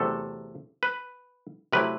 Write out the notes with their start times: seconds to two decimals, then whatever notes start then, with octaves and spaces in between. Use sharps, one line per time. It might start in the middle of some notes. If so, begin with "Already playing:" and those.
Already playing: E2 C3 F#3 A3 A4
0.83 B4
1.73 C3 F#3 A3 E4 B4